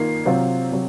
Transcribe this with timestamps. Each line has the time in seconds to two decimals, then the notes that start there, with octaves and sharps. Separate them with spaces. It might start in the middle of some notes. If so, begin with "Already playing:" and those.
Already playing: D#3 A#3 F4 C7
0.26 C3 F#3 C4 F4
0.72 C3 F#3